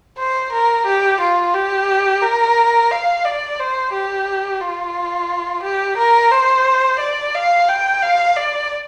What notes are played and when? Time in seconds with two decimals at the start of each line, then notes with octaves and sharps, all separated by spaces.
0.18 C5
0.53 A#4
0.86 G4
1.21 F4
1.54 G4
2.22 A#4
2.91 F5
3.25 D5
3.60 C5
3.93 G4
4.61 F4
5.63 G4
5.98 A#4
6.31 C5
7.00 D5
7.35 F5
7.69 G5
8.02 F5
8.37 D5